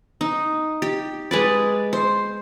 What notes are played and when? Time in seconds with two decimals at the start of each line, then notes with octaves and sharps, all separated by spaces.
0.21 D#4
0.82 G4
1.31 G#3 B4 D5
1.93 C5